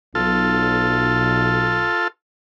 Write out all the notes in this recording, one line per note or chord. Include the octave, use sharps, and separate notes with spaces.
B1 F4 A4